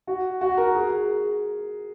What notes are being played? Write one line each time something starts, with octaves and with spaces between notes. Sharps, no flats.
F#4
F#4
A#4
G#4